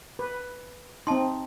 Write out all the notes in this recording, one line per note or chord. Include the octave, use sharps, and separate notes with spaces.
B4
C4 D#4 A5 C6